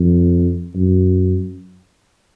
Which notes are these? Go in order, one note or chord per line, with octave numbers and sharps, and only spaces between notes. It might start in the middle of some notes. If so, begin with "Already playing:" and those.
Already playing: F2
F#2